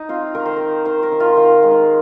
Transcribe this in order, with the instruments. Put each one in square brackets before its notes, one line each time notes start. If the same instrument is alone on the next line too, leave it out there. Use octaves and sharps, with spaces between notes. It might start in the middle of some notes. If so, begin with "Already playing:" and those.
Already playing: [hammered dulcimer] D#4
C4 F4
D#3 A#4
C5
D#3 A#4
D#3 C5
A#4
D#3
F4
D#3 F4
G#3
D#4